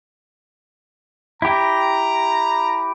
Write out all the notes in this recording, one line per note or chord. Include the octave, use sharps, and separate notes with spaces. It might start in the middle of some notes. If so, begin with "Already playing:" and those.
E4 G4 A#5